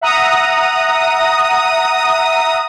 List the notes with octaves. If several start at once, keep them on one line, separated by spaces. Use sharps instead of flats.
E5 F#5 A#5 D#6